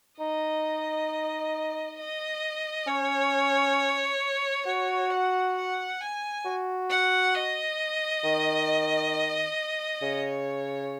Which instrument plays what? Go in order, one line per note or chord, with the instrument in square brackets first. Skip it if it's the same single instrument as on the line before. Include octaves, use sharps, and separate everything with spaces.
[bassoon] D#4 [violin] D#5
[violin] D#5
[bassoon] C#4 [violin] C#5
[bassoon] F#4 [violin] C#5
[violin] F#5
F#5
G#5
[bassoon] F#4
[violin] F#5
D#5
[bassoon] D#3
[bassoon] C#3 [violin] C#5